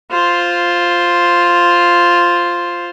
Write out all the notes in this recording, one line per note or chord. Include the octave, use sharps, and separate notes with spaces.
F4 C5